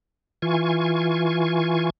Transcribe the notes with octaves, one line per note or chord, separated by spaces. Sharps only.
E3 F4 G#5 C#6